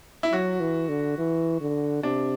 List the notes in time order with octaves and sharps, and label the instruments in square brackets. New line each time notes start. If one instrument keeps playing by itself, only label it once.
[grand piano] E4
[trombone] F#3 [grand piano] F#4
[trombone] E3
D3
E3
D3
[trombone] C3 [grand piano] D4